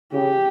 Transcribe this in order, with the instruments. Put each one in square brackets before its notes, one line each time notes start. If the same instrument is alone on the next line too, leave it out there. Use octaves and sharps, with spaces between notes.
[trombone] C#3 [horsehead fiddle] G4